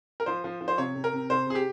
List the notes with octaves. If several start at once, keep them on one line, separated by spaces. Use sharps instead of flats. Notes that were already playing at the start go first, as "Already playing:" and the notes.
A#4
F3 C5
F3
F3
C5
C3 C#5
C3
A#4
C3
C3 C5
C3 G#4
G4